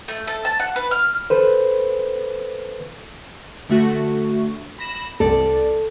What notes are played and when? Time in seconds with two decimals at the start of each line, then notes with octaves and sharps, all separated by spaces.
0.08 A3
0.27 A4
0.45 A5
0.60 F#5
0.76 B4
0.91 F6
1.30 A4 B4 C5
3.69 D3 A3 F#4
4.79 B5 A#6 E7
5.20 C2 A4 D5